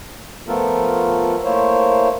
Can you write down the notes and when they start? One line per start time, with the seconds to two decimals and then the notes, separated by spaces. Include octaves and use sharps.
0.47 F3 A3 B3 F4 A4 A#4
1.44 A3 A#3 E4 C5 C#5